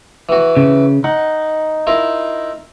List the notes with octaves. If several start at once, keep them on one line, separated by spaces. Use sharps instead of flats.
E3 F#4
C#3
D#4 F#5
E4 F4 A#4